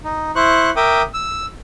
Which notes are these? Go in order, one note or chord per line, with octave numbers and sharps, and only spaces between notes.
D#4
E4 C5 C#6 F#6
A#4 E5 G5 D6 D#6
E6